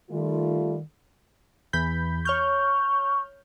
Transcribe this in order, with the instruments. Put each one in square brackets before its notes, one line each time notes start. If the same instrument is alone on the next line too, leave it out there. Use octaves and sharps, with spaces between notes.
[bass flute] D#3 [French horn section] G3 A3 F4
[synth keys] E2 B5 G6
[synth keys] C#5 F6 G6 [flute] C#6